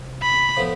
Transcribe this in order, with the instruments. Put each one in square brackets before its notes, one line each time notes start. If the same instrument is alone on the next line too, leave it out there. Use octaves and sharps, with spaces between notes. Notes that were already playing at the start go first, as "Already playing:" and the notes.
Already playing: [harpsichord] C3
[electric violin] B5
[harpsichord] A2 F3 B3 E4